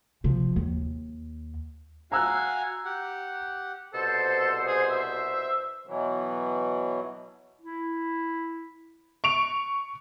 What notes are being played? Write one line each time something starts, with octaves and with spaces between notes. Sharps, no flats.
C3 F3
D#2
F#4 F5 G#5 A#5 E6 F#6
G4 F#5
C2 B2 A4 C5
G#4
E5
B2 E3 F#3
E4
C#6 D7 F7